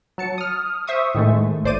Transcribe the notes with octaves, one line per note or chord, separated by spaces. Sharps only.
F#3 A5 C#7
D#6 F6
C5 E5 C#6 D#6
A2 D#3 G#3 A3
G#1 A3 C5 D5 D6 D#7